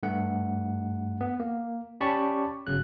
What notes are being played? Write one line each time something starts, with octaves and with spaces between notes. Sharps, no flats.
G2 A3 F#5
B3
A#3
C#4 G4 D5 A5 B5 C#6
G1 C#3 F#3 F#6